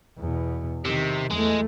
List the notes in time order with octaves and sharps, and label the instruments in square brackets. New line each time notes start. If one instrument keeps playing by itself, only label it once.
[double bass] E2 B2
[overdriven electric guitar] C3 [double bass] D#3
[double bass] E2 A3 [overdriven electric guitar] G#3